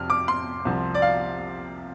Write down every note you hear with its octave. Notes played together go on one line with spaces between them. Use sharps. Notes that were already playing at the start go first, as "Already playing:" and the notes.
Already playing: F2 C3 F3 F6
D6
C6
C2 C3 F3
D5
F5